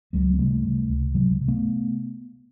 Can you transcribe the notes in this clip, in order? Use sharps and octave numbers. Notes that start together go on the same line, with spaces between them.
C#2 F#3 G#3
A#3
C3 G3 A3
C3
C#2
C3 F#3 G#3
C3
A3 B3